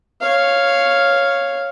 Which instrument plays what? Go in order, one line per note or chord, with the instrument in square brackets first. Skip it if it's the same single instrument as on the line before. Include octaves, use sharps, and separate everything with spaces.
[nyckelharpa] C#5 F5